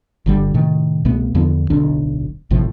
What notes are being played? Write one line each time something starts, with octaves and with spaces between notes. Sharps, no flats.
G1 D3 G3
A2 C3 D#3 A3
C2 B2 A3 B3
E2 D3 F3 B3
D1 B1 D3 D4
G#1 A2 C3 F3